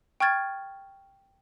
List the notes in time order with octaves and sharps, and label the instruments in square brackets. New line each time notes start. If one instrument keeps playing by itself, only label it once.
[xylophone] G5 C#6 F6 G#6 A6